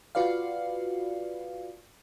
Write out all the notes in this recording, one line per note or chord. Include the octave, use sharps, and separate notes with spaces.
F4 F#4 B4 D5 F5